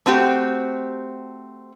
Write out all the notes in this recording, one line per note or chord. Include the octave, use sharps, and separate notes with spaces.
A3 C4 F#4 G4